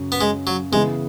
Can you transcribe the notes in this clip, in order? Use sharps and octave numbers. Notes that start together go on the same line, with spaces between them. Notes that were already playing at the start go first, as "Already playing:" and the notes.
Already playing: F#2 C#3 F#3 C#4
B3
G#3
F#3
C#3 E3 G#3 B3 G#4 B4